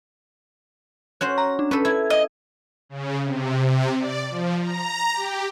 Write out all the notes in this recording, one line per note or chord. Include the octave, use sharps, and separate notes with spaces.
C#4 F#4 C5 F#6
A#5
D4
C#4 A4 B4
E4 G#6
D#5
C#3
C3
C3
D5
F3
A#5
G4